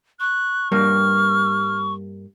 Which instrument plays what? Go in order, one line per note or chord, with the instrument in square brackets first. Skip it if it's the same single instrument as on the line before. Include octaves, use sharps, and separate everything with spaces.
[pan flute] C#6 [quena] F#6
[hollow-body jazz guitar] G2 G3 A#3 [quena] F6